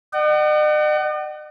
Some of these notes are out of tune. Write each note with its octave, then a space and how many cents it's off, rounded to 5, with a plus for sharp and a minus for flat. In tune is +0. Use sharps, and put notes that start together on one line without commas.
D#5 -45 F#5 +35